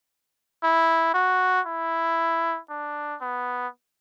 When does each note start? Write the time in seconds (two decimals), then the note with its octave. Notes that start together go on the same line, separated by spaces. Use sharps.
0.63 E4
1.14 F#4
1.66 E4
2.70 D4
3.21 B3